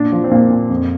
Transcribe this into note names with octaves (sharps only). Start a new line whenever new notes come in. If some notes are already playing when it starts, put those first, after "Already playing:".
Already playing: A#2 D4
F3
C4
A#2 A#3
A#2
F2